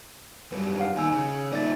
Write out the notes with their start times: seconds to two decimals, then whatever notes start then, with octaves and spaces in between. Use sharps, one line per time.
0.52 F#2 G3 B4
0.80 F5 F#5
0.97 D#2 D#4 G#5 E6
1.11 C#3
1.52 A#2 D#4 D5 E5 A6